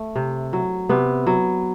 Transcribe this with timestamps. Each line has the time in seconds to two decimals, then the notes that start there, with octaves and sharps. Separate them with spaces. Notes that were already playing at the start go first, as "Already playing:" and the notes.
Already playing: A3
0.16 C3
0.53 F#3
0.89 C3 B3
1.27 F#3